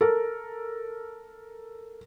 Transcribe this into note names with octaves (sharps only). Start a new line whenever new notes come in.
A4 A#4